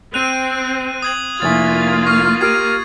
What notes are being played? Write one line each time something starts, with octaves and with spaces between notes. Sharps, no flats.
C4 F#6 D#7 F7
D#6 G#6 F#7
F1 A#3 E4 F4 E5 G#5 C#6 A6
C#6 F6 C7
G4 A#4 F6 G#6 C7 D7 D#7